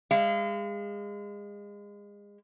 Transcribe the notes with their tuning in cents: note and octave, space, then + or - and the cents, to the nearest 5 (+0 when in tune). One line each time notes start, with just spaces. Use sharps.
G#3 -30 F5 -35